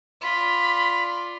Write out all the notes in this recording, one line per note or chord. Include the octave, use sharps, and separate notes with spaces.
F4 D5 B5